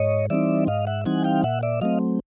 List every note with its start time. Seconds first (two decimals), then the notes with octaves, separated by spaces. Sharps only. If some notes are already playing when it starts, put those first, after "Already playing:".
Already playing: G#2 C#5 D#5
0.30 E3 G3 C4 D#4 D5 E5
0.67 G#2 D#5 F5
0.87 E5 F#5
1.05 E3 G3 C4 D#4 F#5 G#5
1.24 F5 G5
1.43 A#2 E5 F#5
1.63 D5 E5
1.81 F#3 A3 C4 D#5 F5